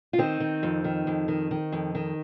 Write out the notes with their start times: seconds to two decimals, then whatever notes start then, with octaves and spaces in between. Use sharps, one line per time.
0.13 F4
0.18 D#3 C4 D#4
0.40 D#3
0.63 F2
0.84 D#3
1.07 F2
1.28 D#3
1.51 D#3
1.72 F2
1.95 D#3